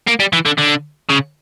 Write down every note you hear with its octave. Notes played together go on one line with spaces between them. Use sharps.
A#3
G3
E3
D3
D3
C#3